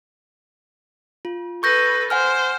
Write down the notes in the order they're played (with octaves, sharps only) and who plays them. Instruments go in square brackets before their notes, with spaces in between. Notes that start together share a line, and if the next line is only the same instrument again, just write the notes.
[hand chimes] F4
[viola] A4 B4 [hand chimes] C#6 G6 A#6
[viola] C5 [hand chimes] F#5 G#5 F6